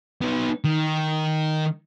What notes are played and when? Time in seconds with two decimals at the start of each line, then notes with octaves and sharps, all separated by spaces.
0.21 B3 D#4
0.64 D#3